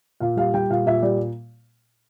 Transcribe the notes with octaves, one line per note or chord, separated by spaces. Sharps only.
A#2 F5
G3 F5
G3 G5
A#2 F5
A#2 E5
G3 D5